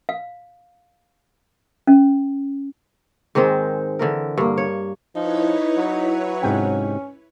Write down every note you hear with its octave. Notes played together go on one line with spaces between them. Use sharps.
F5
C#4
G#2 D#3 G#3 C4
D3 E3 A#4
G2 A#3
C#5
F3 D#4 E4 B4 C#5
F#3
G#2 C3 C#4 G5